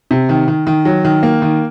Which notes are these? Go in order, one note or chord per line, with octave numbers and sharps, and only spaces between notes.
C3
D#3
D#3
D#3
F#3
D#3
A#3
D#3